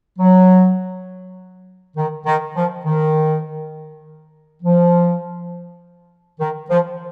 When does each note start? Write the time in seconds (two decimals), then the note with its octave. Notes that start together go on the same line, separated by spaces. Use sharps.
0.19 F#3
1.97 D#3
2.26 D#3
2.56 F3
2.85 D#3
4.63 F3
6.40 D#3
6.70 F3